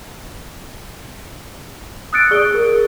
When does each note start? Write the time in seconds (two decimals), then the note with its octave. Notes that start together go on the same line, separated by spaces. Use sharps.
2.13 D#6 E6 F#6 A6 C#7 D7
2.31 G#4 D5 G7
2.54 A#4